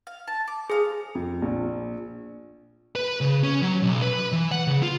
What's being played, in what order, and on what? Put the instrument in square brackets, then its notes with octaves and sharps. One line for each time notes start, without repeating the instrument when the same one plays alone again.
[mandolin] F5
A5
D6
[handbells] G#4 [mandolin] C5 F5
[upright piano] F2
A#1
[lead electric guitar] B4
C#3
C#4
F#3
B1
B4
E3
F#5
C#3
F4